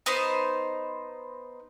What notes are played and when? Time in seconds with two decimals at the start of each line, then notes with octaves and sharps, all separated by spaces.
0.06 B3 D#4 C5